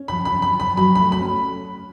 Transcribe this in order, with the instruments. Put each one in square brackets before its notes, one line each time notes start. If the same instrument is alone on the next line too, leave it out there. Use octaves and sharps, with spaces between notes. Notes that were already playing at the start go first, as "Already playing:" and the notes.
Already playing: [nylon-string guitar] C#4
[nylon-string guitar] F3 [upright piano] B5
[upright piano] B5
[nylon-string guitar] F3
[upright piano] B5
[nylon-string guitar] F3 [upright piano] B5
[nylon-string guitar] F#3 [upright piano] B5
[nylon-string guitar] A3 [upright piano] B5
[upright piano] B5
[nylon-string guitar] C#4